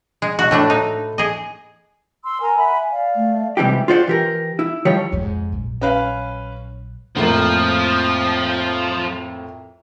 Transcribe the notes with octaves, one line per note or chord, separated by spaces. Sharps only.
G#3
F#4 D#5 F#6
A2 A3 D4 A4 B5
D#4
G#4 D#5
C6 E6
A#4 G#5 A#5
E5 F#5 B5
D5 F5
A3
G#2 C3 E3 G3 G4
F4 G#4 C5 D5 F5 F#5
E3 G4 A#4
E4
D#3 F3 G3 C#5
F2 G#2
A#1 F#3
C#4 B4 F5
F2 A2 F3 A#3